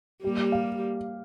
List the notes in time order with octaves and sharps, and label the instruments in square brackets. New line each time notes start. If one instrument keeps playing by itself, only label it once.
[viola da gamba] G3 A#3 [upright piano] G4
[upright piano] F5